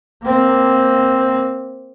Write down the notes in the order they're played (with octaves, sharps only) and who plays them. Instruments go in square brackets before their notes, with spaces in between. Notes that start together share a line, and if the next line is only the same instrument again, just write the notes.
[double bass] A#3 C4